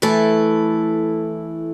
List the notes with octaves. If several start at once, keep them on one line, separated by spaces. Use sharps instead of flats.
E3 A3 E4 A4